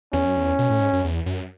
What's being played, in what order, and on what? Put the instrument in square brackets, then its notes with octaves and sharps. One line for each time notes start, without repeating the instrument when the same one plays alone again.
[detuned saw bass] E2 [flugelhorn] C#4
[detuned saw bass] F#2
E2
B2
A2
G#2
F#2
E2
F#2